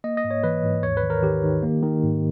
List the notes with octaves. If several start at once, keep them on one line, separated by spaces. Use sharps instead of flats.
A#3 D#5
D#5
G#2
C#5
E3 B4
G#2
D#2 C#5
B4
D#3
A#4
D#3 G4
D#3
A#3
D#3
G#2